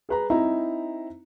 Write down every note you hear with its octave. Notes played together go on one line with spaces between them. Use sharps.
G#4 B4 A#5
C4 D#4 E4 A#5